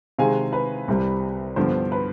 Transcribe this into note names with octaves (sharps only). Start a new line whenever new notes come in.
C3 D#3 G#3 F5 G#5
B4
C2 C3 G3
G2 D3 F3 B3 C5
B4